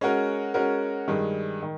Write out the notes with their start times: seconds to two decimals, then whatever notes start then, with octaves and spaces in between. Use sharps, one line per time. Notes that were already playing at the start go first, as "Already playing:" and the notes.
0.01 G#3 C#4 F#4 A#4
0.54 G#3 C#4 F#4 A#4
1.08 G2 D#3 G#3
1.62 D#3